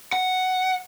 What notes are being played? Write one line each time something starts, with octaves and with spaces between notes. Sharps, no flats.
F#5